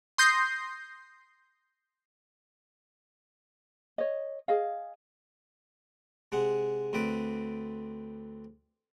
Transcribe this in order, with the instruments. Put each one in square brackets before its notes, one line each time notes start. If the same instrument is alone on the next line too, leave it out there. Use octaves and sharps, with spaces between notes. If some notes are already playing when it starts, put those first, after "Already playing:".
[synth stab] C6 D#6 G6 A#6 C7
[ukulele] C#5 D#5
G#4 D#5 F5
[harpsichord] C3 G#3 F#5
D2 C4 B4 D5